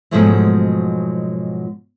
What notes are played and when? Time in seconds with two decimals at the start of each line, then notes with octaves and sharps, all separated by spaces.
0.11 G#2 B2 F3 F#3 G#3 A3